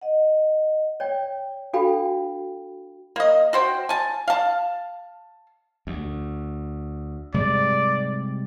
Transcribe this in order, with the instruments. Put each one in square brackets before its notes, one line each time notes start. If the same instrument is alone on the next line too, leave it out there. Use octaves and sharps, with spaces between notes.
[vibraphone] D#5 F#5
[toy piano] C#5 D5 G5
D4 F#4 A4 F5 G5 B5
[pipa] A#3 D#5
F#4 C5 G5
G#5 A5
F5 A5
[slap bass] D2
[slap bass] G#2 C3 G3 [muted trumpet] D5